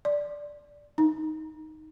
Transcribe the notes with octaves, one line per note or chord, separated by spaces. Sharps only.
D5
D#4